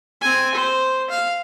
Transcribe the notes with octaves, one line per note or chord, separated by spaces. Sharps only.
C4 G#5
C5
F5